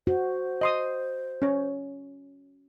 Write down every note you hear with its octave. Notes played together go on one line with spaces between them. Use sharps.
F#4 C5
D#5 C6 D#6
C#4 C#5